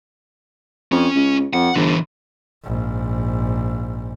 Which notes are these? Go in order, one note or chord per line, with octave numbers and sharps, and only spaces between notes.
F2 C#4
C#2
F2 F#5
G1 D3 E3
A#1 G#2